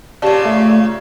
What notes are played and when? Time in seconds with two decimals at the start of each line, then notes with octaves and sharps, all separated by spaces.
0.22 A#2 C#3 G4 D5 A5
0.45 A3